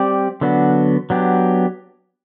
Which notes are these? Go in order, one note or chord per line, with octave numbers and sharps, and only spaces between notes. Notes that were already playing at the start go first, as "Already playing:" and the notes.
Already playing: G3 C4 G4 D5
D3 F#3 B3 D4 F#4
F#3 B3 D4 G4